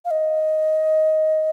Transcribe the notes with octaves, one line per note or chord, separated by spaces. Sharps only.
F5
D#5